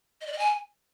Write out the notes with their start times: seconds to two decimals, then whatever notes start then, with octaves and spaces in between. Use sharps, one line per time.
0.21 D#5
0.27 D5
0.33 D#5
0.39 G#5